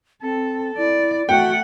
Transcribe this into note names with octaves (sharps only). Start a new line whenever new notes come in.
C4 A4
E4 D5
A3 F#4 F#5 G5